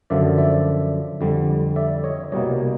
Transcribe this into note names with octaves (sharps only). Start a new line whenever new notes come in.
F#2 D3 F3 D5 E5
D5 E5
F2 D3 G3
D5 E5
C#5 D#5
C2 B2 G3 A#3 C#5 D#5